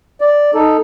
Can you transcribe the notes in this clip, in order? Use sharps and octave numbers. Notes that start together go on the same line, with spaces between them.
D5
D#4 A4